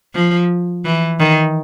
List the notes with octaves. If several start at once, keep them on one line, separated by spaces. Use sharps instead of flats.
F3
E3
D#3